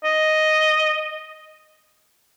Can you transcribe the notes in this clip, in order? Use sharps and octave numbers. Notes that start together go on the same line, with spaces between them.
D#5